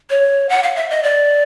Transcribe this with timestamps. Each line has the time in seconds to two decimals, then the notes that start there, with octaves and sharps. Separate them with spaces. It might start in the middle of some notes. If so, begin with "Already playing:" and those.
0.10 C#5
0.49 F#5
0.63 F5
0.76 E5
0.90 D#5
1.03 D5